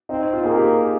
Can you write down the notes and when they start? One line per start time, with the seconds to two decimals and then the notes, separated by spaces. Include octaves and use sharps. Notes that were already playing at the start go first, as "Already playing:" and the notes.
0.09 C4 D#4
0.33 F4
0.45 A#3 G#4
0.57 G4